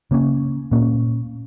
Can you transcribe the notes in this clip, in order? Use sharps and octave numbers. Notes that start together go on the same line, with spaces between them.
C#3 A#3 C#4
A#2 A#3 C#4